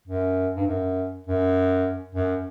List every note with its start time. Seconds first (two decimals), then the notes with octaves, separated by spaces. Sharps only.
0.08 F#2
0.56 G2
0.67 F#2
1.27 F#2
2.15 F#2